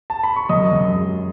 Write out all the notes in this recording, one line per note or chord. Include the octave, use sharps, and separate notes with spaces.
A5
B5
C#6
F#2 D#5 D#6
F#2
G#3